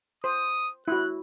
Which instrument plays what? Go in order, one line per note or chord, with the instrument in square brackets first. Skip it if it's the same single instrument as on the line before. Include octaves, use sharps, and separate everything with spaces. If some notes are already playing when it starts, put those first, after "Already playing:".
[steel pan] C5 [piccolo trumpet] D#6
[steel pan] E4 F#4 [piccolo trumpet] F#6